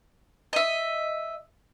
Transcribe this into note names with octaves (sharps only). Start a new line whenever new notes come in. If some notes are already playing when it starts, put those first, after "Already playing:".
D#5 E5